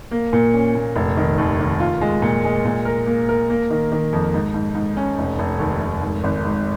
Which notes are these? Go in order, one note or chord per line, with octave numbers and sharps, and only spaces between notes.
A#3
A#2
C#4
A#2
F1
D#3
D#2
D#3
F4
G#3
A#2
G#3
A#2
A#4
A#3
A#4
A#3
D#3
D#3
F2
G#2
G#2
G#2
C#4
F1
F1
D#2
F1
G#2
G#1
G#2